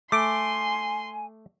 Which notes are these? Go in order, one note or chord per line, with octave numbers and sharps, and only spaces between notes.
A3 G#5 C6 D6 D7